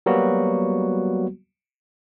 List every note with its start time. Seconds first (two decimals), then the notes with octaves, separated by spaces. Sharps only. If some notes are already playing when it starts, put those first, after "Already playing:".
0.06 F#3 G3 A#3 B3 F#4